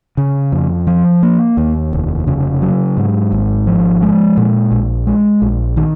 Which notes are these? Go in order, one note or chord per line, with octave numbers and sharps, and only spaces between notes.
C#3
F2
F3
A#3
D#2
F1
C#3
F#3
G#2
G#1
F3
G#3
A#2
A#1
G#3
A#1
D#3